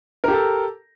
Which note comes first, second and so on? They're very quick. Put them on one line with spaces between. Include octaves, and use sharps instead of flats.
A#4 G4 A4